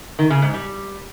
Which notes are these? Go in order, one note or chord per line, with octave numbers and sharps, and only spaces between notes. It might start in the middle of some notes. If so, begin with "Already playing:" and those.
D#3
C#3
G#2
G3